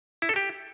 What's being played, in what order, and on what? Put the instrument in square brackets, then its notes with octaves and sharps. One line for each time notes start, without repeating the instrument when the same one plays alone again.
[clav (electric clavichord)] E4
A4
G4